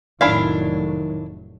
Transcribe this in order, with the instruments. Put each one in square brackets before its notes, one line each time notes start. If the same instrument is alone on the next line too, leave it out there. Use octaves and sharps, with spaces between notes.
[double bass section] F1 A2 F#3 [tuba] D#3 [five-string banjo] D4 E4 F5